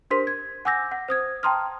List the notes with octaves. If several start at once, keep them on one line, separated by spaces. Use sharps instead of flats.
D4 G4 A#4 C5 C6 B6
G#6
F#5 G#5 D6 E6 G6 A#6
F#5
C5 D#6 G#6
G5 A5 A#5 C6 D#6 F6